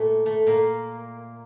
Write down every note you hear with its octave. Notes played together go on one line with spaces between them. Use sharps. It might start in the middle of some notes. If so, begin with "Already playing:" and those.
Already playing: A#2 A3
A3
A#2 A#3